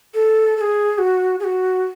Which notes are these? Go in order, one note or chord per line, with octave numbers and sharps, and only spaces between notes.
A4
A4
G#4
F#4
G#4
F#4